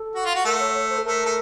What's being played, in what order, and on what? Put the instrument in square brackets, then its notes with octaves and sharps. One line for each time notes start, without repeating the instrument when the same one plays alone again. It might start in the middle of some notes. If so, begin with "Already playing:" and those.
Already playing: [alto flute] A4
[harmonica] F#4
F4
F#4
[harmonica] A3 [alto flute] A#4
[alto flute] C#5
C#5
C5
A4
[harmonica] A3 [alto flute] A#4
[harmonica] A3